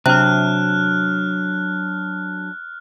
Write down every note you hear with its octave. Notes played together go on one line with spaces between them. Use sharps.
C3 F#3 D4 F6 F#6